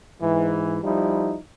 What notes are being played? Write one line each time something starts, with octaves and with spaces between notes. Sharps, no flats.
G#2 E3
F3 G3 D#4 E4